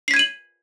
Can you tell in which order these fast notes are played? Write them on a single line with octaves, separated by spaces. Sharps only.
C7 B6 G#6 D#7 F#7